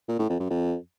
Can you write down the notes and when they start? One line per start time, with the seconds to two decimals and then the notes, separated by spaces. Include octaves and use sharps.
0.09 A#2
0.19 A2
0.29 F2
0.40 F#2
0.50 F2